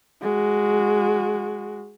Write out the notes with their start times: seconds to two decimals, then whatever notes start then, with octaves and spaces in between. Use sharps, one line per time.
0.21 G#3 F#4